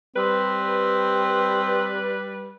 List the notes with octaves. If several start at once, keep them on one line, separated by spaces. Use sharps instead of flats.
G3 C4 B4